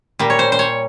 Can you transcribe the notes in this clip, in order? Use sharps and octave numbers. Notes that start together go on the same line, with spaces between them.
A#2 G3
C#5
C5
C5
C#5